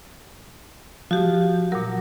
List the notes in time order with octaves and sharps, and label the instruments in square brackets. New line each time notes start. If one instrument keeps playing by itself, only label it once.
[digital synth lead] F3 [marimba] F#4 G4
[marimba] A#2 A#4 [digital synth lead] F#3